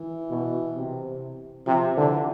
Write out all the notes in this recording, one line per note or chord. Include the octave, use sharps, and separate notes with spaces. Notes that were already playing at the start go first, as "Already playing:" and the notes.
Already playing: E3
B2
C3
C3 F3
D3 E3